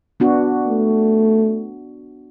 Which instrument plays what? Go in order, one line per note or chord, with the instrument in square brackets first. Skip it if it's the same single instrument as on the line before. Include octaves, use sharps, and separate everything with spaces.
[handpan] B3 D4 F#4
[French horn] A3